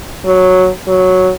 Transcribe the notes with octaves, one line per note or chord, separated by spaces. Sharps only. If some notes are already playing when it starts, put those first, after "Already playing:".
F#3
F#3